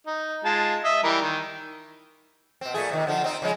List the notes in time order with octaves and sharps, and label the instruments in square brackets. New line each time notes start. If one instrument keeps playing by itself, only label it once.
[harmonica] D#4
G#3 F4 A5
D#5 E5
E3 G3 A#4
D#3
[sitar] B2 C4
A#2 A3 G#4
C3 D#3
D3 F3
C4 D#4
C#3 F3 G#3